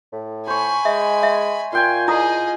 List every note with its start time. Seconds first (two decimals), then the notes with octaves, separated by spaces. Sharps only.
0.12 A2
0.47 C5 C#5 G#5 B5
0.85 G#3 E5
1.23 E5
1.73 A#2 F4 G5 G#5 C6
2.08 E4 G#4 D#5 A#5 D#6